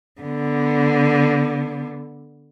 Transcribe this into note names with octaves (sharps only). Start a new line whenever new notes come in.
D3 B3